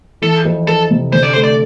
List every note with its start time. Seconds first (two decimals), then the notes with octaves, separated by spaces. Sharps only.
0.22 E3 A4
0.45 F2
0.67 F2 A4
0.91 C3
1.12 D3 C5
1.23 D5
1.33 A3 C5
1.44 D5